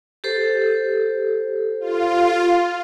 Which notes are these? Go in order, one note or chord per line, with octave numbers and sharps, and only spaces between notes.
G4 A4 C5
F4